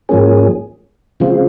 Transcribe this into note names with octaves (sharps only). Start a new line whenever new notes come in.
G#2 F3 A#3 C#4 G#4
C#3 F3 G#3 C4 F4